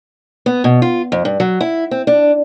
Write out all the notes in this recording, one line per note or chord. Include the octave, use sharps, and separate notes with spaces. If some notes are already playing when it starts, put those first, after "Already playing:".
B3
B2
F4
F2
G2
F#3
E4
C4
D4